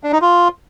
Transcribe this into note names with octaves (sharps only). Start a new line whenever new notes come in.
D4
D#4
F4